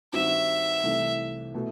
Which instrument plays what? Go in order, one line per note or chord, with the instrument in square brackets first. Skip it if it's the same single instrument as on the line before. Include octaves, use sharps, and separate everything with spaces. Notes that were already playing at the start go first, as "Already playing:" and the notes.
[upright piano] G2 D#3 G3 C4 F#4 [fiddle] E5
[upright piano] C2 C3 E3 A3 E4
B2 A3 E4